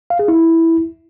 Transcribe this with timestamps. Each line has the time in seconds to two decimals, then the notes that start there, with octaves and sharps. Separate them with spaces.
0.10 F5
0.19 G#4
0.28 E4